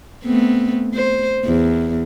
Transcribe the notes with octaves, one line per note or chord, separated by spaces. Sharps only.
A3 B3 C4
C5
E2